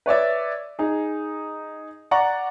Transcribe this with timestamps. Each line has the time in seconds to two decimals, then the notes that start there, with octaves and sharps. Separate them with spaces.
0.06 B4 C#5 D5 E5
0.79 D#4 G#4
2.11 D5 F#5 A#5 C#6